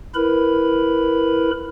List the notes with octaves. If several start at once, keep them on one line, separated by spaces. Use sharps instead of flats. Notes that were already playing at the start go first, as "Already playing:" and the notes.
E4 A#4 B4 B5